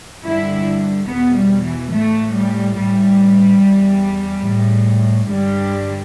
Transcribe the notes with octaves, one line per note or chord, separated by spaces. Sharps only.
G2 D3 E4
E2 B2 B3
G3
E3
A2 E3 A3
G3
A2 E3 G3
E2 E3
A2 E3
G2 D3 G3